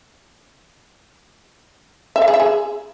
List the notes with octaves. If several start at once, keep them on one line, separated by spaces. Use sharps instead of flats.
E5
F5
G#4
E5
G#4